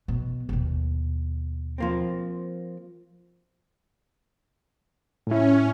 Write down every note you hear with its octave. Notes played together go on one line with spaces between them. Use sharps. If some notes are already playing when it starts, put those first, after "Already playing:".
B2
D#2 B2
F3 A#3 C4
A2 C#4 E4